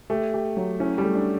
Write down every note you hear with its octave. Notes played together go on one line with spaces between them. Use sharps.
A3 G4
G4
F#3
C#4 E4
G3
A3
D4